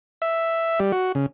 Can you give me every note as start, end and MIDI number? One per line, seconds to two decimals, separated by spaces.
0.22 0.80 76
0.80 0.92 55
0.92 1.12 66
1.15 1.26 49